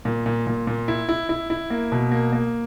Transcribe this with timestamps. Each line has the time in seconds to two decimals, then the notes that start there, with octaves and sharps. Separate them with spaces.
0.05 A#2
0.26 A#2
0.47 A#2
0.67 A#2
0.88 E4
1.09 E4
1.29 E4
1.50 E4
1.70 A#3
1.92 B2
2.12 A#3
2.32 A#3